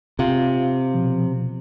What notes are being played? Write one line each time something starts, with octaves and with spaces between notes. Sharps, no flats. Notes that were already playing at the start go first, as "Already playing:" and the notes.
C3 F4 F5
B2 F3